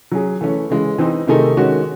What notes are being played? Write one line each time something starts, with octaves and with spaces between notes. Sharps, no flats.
F#3 C#4 G#4
E3 A3 C#4
C#3 E3 G#3
E3 C4 D#4
C3 D#3 A3 D#4 G#4
D#3 G#3 C#4 F#4